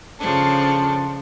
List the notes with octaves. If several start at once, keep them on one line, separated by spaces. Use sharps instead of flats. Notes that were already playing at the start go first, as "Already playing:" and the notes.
C#3 F3 D4 A4